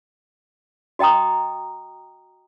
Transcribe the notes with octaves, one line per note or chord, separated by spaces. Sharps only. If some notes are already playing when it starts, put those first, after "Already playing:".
F#4 D#5 G5 A#5 D#6